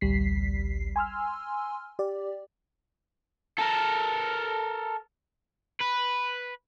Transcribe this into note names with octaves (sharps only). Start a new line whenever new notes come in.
A1 D2 G3 B6 C7
G#5 C6 E6 F6
G4 D5
A4 A#4
B4